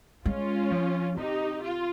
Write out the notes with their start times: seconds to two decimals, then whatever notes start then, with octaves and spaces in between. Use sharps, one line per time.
0.26 G#3 C#4 F4
0.71 F3
1.17 C3 D#4 G4
1.62 F4